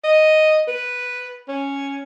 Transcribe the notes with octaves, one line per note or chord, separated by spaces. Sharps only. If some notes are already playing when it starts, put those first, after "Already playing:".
D#5
B4
C#4